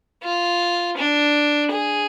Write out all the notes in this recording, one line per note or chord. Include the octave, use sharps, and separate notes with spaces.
F4
D4
G#4